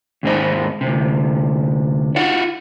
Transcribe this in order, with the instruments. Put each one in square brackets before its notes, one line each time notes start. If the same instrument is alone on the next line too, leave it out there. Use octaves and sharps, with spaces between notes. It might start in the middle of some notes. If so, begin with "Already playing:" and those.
[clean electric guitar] D#2 G#2 C4 D#5
D2 C3
E4 F4 F5 F#5